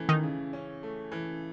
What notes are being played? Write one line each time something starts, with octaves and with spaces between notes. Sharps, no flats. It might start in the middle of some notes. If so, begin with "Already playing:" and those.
Already playing: C#3 E3 A3 C#4
D#3 D#4
C#3
C#4
A3
E3